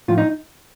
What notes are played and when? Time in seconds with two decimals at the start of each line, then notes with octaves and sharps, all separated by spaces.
0.08 A2 F3 F4
0.18 D#4